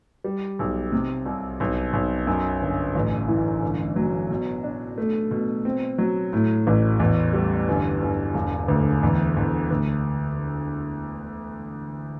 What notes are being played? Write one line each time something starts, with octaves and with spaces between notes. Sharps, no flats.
G3
B1
C3
C2
B1
B1
F#2
G1
A1
E3
G1
F#3
B2
D4
A3
B2
C4
F#3
A2
A1
E2
G3
G1
G1
E1
D2
E2
E2
D2